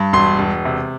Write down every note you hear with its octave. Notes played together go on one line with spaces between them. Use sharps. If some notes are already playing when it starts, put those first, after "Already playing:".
Already playing: G2
E1 C6
E1
C3